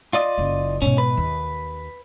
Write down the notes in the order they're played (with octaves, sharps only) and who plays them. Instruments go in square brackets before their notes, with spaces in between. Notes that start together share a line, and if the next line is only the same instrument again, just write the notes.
[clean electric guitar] F4 D5 D#5
[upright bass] F#1 C#3
[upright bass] G#2 B2 [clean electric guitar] C#4
[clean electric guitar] B4
[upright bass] D#2